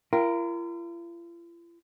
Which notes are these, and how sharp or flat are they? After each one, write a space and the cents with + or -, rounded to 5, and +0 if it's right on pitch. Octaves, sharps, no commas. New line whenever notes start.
F4 -45 A#4 +0 G5 -30